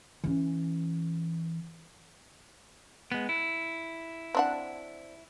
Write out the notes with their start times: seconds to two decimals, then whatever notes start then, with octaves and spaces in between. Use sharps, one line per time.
0.24 E3 C#4
3.12 G#3 B3
3.29 E4
4.35 C4 D4 F#5